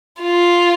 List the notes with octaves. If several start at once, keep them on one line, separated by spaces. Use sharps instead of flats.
F4